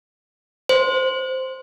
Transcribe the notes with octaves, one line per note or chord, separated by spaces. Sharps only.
C5